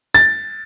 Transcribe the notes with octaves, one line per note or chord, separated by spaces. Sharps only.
A6